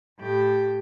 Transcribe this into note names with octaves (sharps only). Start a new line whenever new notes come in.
A2 G4